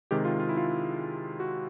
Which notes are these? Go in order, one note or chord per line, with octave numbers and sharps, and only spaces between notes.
C3 D#3 G#3 G4
F4
F4
E4
F4
F#4